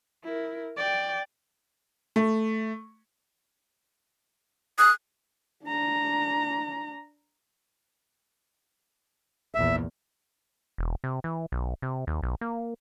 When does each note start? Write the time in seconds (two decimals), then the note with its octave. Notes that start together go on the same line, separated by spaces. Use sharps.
0.24 E4 A#4
0.77 D5 G5
2.16 A3
4.79 D#6 F#6
5.65 D4 A#5
9.55 A#1 E2 E5
10.78 E1
11.04 C3
11.24 E3
11.52 B1
11.82 C3
12.07 D#2
12.23 B1
12.41 A#3